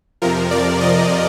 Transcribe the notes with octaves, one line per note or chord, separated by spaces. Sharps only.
F2 C3 F3 A#4
D5
D#5